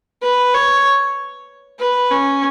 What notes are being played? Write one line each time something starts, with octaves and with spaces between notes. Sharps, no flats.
B4
C#5
B4
C#4